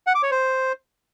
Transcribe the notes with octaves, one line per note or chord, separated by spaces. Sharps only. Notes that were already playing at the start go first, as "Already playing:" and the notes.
F#5
D6
C#5
C5